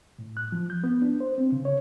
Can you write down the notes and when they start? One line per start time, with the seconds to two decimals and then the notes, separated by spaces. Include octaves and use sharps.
0.19 A2
0.37 F#6
0.52 F3
0.70 G6
0.84 B3
1.02 D4
1.20 C5
1.38 C4
1.52 C#3
1.65 C#5